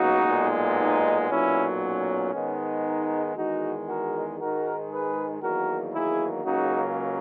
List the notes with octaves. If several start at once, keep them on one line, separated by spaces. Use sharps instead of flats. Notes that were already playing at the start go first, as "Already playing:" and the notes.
Already playing: C#2 B2 F#3 A#3 D#4 F#4
B1 A#2 G#3 B3
D#4
B1 A#2 F#3 B3 C#4 E4
C#4
G#2 D#3 G#3 B3
D#4
E2 D#3 G#3 D#4 F#4
F#4 A#4
G#2 D#3 G#3 F#4 A#4
G#4 B4
E2 D#3 F#3 A#3 F#4 A#4
E4 G#4
C#2 C#3 F#3 A#3 D#4 F#4